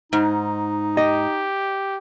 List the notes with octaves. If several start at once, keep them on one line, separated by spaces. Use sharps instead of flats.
G#2 D#4
G4 D#5